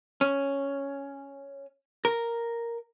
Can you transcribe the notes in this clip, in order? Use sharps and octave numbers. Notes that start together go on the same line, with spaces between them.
C#4
A#4